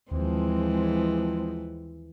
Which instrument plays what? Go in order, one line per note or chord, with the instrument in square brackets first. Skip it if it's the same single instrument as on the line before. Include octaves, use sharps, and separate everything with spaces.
[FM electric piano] D#2 [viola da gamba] E3 [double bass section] F3 G#3 C4